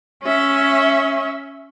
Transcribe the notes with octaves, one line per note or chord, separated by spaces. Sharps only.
C#4 E5